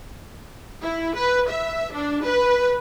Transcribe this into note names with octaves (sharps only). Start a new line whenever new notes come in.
E4
B4
E5
D4
B4